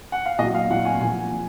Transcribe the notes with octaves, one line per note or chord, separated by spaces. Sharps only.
F#5
F5
A#2 F#3 D#5
F5
A#2 F#3 F#5
G#5
A#2 F3 G#5
A#2